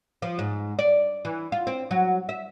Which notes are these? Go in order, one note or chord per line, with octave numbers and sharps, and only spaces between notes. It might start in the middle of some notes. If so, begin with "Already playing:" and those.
F3
G#2
D5
E3
F4
C4
F#3
E5